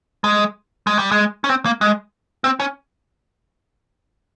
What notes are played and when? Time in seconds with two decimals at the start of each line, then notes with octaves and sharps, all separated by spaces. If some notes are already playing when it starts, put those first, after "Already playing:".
0.24 G#3
0.87 G#3
0.99 G3
1.11 G#3
1.44 C#4
1.49 C4
1.65 A#3
1.81 G#3
2.44 C4
2.60 C#4